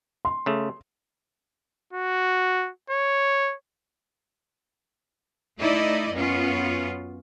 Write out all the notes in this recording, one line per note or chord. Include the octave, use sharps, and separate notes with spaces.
C6
C#3 A3
F#4
C#5
A3 D#4 E4 D5 D#5
F#2 B3 C#4 F4